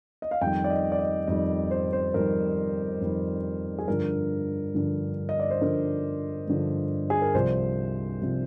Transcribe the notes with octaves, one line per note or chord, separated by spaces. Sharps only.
D#5
F5
F2 D#3 G3 G5
D5
D#5
D5
D#5
F2 D#3 G3 D#5
C5
C5
F2 D#3 G3 A#4
F2 D#3 G3
G#4
G2 D3 F3 A#4
G2 D3 F3
D#5
D5
C5
G2 D3 F3 A#4
G2 D3 F3
G#4
A#4
C2 C3 F3 C5
C2 C3 F3